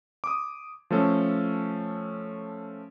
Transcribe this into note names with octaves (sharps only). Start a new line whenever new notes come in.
D6 D#6
F3 A3 C#4 A4